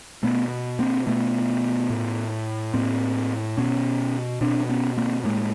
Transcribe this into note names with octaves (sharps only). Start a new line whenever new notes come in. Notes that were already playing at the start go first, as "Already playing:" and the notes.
B2 A3 B3
A#3 C4
B2 A3 B3
A2
A2 A#3 C4
B2 B3 C#4
B2 C4 D4
B3 C#4
A#3 C4
A2 G#3 A#3